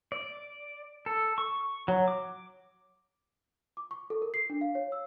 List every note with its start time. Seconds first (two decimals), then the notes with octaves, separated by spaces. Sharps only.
0.12 D5
1.06 A4
1.38 C#6
1.88 F#3
2.08 D6
3.77 D6
3.91 C#6
4.10 A4
4.22 A#4
4.34 C7
4.50 D4
4.61 F5
4.75 C#5
4.92 E6